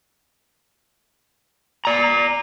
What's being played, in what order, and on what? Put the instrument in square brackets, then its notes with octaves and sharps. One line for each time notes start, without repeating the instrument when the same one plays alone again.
[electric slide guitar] D5 A#5